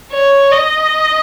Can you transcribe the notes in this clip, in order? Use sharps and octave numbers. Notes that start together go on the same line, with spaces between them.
C#5
D#5